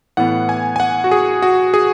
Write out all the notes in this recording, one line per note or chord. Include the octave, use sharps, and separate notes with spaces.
A2 E3 B3 F#5
G#5
G#5
F#5
F#4
G#4
F#4
G#4